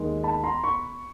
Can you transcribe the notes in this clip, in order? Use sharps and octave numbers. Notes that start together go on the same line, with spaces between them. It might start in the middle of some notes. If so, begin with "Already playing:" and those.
Already playing: D#2 D#3 G#3
A5 B5
A#5 C6
B5 C#6